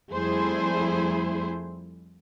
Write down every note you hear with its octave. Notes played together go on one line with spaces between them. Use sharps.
F2 G3 A3 E4 G#4 C5